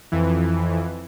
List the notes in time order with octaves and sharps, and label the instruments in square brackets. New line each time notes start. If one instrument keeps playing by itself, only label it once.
[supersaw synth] F2 E3